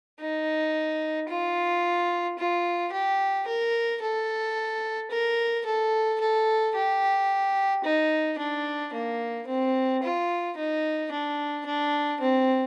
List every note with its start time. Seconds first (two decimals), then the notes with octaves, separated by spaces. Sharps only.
0.21 D#4
1.29 F4
2.39 F4
2.92 G4
3.47 A#4
4.02 A4
5.11 A#4
5.66 A4
6.21 A4
6.75 G4
7.84 D#4
8.38 D4
8.94 A#3
9.47 C4
10.03 F4
10.57 D#4
11.12 D4
11.66 D4
12.21 C4